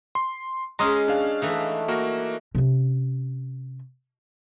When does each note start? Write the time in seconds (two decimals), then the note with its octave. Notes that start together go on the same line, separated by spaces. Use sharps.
0.15 C6
0.79 G#3 C#4 A#5 C6 D#6
1.08 D4 F5
1.42 E3 A3 D#4
1.88 A#3 F#4 A#4
2.55 C3 C#4